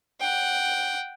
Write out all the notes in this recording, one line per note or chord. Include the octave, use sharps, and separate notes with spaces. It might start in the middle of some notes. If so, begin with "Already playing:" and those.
F#5 G5